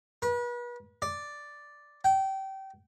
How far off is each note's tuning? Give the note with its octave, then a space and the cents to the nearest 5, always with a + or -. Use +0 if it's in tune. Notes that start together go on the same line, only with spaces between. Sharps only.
B4 -35
D5 +0
G5 -25